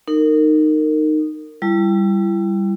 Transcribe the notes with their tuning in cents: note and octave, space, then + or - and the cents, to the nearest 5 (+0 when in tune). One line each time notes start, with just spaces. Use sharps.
D#4 -15 A#4 -25
G3 +0 E4 +30